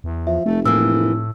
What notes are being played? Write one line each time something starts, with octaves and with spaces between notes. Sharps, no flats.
E2
F3 E5
F1 A3
A2 E3 A#3 E6